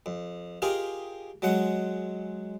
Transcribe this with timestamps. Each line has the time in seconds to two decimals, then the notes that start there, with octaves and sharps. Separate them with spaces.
0.06 F2
0.62 F4 G4 G#4 A#4 D#5
1.42 F#3 G#3 F#5